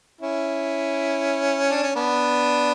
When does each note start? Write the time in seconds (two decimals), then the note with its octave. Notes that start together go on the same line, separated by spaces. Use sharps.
0.21 C#4 E4
1.70 D4
1.82 C#4
1.95 B3 D4